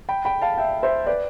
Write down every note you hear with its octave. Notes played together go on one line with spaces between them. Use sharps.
G5 B5
G5 B5
F5 A5
E5 G5
C5 E5
B4 D5